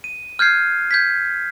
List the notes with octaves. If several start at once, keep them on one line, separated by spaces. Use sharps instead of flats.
D#7
F6 G6 G#6 C7
G6 G#6 B6